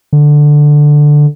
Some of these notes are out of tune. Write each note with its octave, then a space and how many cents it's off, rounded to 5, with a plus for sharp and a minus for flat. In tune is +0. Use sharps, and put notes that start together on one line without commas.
D3 +5